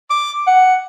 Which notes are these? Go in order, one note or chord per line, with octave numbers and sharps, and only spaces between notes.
D6
F#5